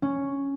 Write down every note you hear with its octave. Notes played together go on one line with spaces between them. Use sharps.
C#4